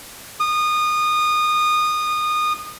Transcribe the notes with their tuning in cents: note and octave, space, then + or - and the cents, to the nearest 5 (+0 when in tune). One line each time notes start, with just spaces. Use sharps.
D#6 -25